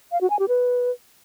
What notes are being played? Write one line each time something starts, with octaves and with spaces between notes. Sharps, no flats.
F5
F#4
G#5
G4
B4